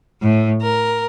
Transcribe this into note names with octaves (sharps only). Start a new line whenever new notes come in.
A2
A#4